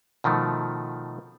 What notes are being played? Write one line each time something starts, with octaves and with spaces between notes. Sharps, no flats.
B2 D#3 F3 A3